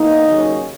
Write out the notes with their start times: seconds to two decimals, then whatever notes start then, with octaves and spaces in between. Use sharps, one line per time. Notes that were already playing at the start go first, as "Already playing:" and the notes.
Already playing: E2 D#3 A#3 D#4
0.25 D#2 C#3 F#3 C#4